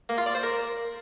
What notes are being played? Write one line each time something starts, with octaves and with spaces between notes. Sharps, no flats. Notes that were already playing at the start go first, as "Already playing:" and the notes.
A#3
F4
D5
C5
A#4